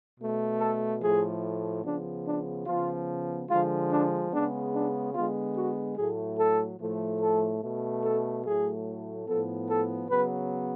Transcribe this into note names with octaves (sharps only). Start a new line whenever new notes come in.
B2 A3
A4
A2 F3 A3 G#4
C#3 F3 B3 D4
D4
C#3 F3 B3 F4
D3 F3 G#3 F4
D4
C#3 G#3 B3 D4
D4
D3 G#3 B3 F4
F#4
A2 F#3 A3 G#4
A4
A2 F3 A3
A4
B2 A3
A4
A2 F#3 A3 G#4
A2 F3 B3 A4
A4
C#3 F#3 B3 B4